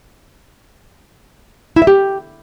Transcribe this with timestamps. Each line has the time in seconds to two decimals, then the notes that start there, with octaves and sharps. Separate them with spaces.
1.76 E4
1.82 E5
1.87 G4